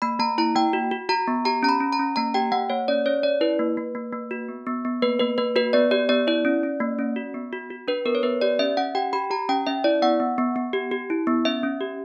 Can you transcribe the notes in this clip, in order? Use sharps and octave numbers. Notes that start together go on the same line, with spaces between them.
A#3 B5
A#3 A#5
E4 A#5
A#3 G5
F#4
F#4
F#4 A#5
B3
G4 A#5
C#4 A#5
B5
C#4
A#5
C#4
A#3 A#5
G4 G5
A#3 F#5
A#3 C#5
C#4 D5
C#4 C#5
C#4 D5
E4 B4
A#3
A#3
A#3
A#3
F#4
B3
B3
B3
A#3 B4
A#3 B4
A#3 B4
F#4 B4
B3 D5
G4 D5
B3 D5
E4 D5
C#4
C#4
A#3
C#4
F#4
B3
F#4
F#4
D4 B4
B3 A#4
C#5
B3 B4
G4 D5
C#4 E5
C#4 F#5
G4 G5
G4 B5
G4 A#5
C#4 G5
C#4 E5
E4 D5
B3 F#5
B3
B3
B3
G4
G4
E4
B3
C#4 E5
C#4
G4